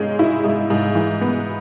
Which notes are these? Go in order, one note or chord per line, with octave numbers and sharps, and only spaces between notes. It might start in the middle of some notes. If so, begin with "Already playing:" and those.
Already playing: G#2 G#3 C#4
E4
G#2
G#2
E3
B3